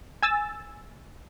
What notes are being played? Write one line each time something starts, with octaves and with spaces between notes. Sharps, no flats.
G#5 E6 A6